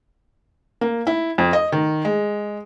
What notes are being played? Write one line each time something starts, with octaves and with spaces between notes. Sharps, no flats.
A#3
E4
F2
D#5
D#3
G#3